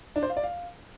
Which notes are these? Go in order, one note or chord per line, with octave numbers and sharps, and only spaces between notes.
D4
C5
F5
D5
F5